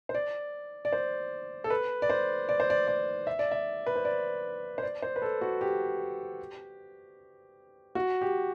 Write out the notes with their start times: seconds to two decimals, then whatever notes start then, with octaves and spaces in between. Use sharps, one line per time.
0.09 C5
0.14 D5
0.85 D5
0.92 C5
1.64 A4
1.70 B4
2.02 D5
2.10 C5
2.49 D5
2.60 C5
2.70 D5
2.87 D5
3.27 E5
3.39 D5
3.51 E5
3.86 B4
3.96 C5
4.05 D5
4.78 C5
4.83 D5
5.02 C5
5.16 B4
5.22 A4
5.41 F#4
5.61 G4
7.95 F#4
8.21 G4